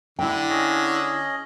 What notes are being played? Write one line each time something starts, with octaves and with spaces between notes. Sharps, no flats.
D3 E4 G5
C#4 G#4 D#5